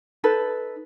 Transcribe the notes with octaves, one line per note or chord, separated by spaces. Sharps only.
D#4 A4 B4